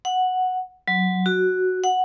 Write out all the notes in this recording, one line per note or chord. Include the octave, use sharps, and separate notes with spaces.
F#5
F#3
F#4
F#5